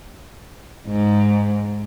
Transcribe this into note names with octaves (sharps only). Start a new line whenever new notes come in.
G#2